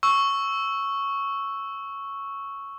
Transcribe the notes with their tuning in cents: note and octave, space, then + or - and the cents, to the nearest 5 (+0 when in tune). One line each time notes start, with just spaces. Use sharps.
C#6 +0 E6 +0